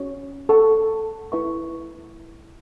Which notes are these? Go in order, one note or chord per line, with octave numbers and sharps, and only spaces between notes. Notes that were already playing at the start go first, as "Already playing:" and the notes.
Already playing: C#4 F#4 C#5
A4 F#5 A5 C#6
E4 B4 E5 C#6